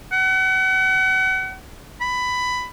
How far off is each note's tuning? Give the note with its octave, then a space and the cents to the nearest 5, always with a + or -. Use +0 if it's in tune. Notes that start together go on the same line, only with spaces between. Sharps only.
F#5 +35
B5 +15